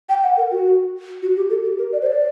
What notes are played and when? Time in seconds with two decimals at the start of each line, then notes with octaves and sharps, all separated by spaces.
0.09 G5
0.23 F#5
0.37 A#4
0.51 F#4
1.22 F#4
1.36 G4
1.50 A4
1.64 G4
1.78 A#4
1.92 D5
2.02 C5
2.06 D5